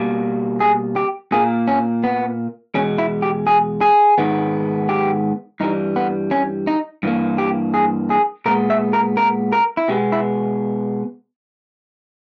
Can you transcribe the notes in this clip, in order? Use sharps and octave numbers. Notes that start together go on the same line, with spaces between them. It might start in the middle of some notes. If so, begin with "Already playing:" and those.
Already playing: B2 G3 A#3
G#4
G4
A#2 A#3 G#4
C#4
B3
E2 B2 G#3 C#4
E4
G4
G#4
G#4
G#2 D#3 G#3 B3
G4
G2 E3 G3 D#4
B3
C#4
D#4
G2 E3 A#3
G4
G#4
G#4
A#2 G#3 B3 A#4
E5
A#4
A#4
A#4
E4
B2 G#3 B3 G4
E4